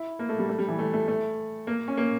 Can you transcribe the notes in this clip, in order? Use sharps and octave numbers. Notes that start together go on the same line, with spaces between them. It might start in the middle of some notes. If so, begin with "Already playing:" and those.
Already playing: E4
A#3
A3
G3
A3
G3
E3
A3
A3
A3
A#3
C#4
A#3